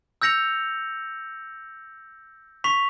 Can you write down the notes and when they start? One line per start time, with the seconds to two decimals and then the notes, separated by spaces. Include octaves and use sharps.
0.22 E6 G6 A#6 C#7 F7
2.64 C#6 B6 F7